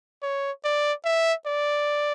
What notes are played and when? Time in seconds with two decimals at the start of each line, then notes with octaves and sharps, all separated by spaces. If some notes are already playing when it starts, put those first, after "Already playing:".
0.23 C#5
0.64 D5
1.05 E5
1.46 D5